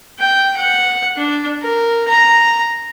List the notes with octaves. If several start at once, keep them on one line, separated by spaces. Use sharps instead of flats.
G5
F#5
D4
A#4
A#5